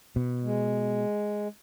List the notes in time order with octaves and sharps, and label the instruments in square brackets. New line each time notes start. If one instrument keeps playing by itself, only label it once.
[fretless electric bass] B2
[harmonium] G#3